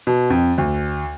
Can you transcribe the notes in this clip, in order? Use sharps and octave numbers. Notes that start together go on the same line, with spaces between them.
B2
F2
D2